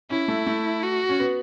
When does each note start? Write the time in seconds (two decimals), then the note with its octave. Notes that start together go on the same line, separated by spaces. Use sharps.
0.10 C#4 E4
0.28 A3
0.46 A3
0.83 F#4
1.09 C#4
1.20 B3